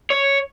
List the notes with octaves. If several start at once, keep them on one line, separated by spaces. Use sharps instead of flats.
C#5